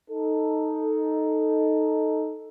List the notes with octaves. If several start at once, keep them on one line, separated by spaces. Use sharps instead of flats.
D#4 A4